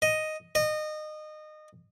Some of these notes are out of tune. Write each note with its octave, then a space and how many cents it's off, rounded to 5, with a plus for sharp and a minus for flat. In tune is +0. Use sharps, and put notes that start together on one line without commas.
D#5 +0
D#5 -25